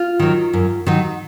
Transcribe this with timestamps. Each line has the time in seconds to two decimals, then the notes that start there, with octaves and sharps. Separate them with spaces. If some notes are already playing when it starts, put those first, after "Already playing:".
Already playing: F4
0.19 D#3 F#3
0.53 F#2
0.87 D#3 F#3